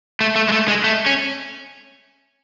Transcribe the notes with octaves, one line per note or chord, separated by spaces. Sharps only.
A3
A3
G#3
A3
G#3
A3
C#4